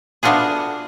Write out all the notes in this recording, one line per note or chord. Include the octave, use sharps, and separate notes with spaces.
A3 B3 D4 F4 F#4 G#4